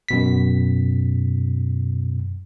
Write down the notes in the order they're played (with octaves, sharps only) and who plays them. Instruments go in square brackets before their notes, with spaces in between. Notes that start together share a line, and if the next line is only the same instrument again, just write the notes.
[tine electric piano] F#2 B2 B6